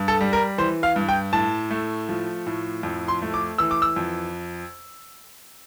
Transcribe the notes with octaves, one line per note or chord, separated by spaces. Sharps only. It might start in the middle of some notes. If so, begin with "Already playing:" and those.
Already playing: G2
A4
G3
A#4
E3 C5
F5
G2
G5
A2 A5
A3
F3
A2
F2
C6
A3
D6
E3 E6
D6
E6
F2